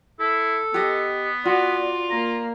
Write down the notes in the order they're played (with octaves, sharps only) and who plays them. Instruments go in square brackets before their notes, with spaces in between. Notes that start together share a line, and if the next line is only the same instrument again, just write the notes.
[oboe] E4 [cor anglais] A4
[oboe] B3 [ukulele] G4 D#5
[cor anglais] F4 [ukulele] F#4 [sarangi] D5
[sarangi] A#3 [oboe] A#5